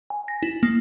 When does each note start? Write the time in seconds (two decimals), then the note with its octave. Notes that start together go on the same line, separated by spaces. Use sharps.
0.10 G#5
0.28 A#6
0.43 E4
0.63 A#3